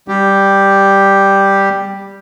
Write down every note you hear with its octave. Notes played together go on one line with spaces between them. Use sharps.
G3 G4